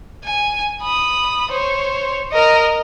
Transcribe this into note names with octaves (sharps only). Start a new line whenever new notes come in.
G#5
B5 D#6
C5 C#5
A#4 D#5